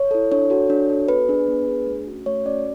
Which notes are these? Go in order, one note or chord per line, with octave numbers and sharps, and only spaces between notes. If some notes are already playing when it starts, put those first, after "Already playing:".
Already playing: C#5
E4 A4
D4 C#5
F#4 A4
D4
F#4 A4
B3 B4
D4 G#4
B3
D4 G#4
A3
C#4 F#4
A3 C#5
C#4 F#4 D5